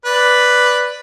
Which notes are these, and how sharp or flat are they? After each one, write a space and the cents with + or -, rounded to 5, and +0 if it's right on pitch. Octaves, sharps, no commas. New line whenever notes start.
B4 +0 D5 +0